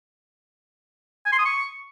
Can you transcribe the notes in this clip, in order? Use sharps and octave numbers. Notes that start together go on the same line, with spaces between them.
G#5
C6
D#6
C#6